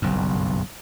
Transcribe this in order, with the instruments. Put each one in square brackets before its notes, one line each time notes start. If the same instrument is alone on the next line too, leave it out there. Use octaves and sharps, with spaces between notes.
[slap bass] F#1 B1 G2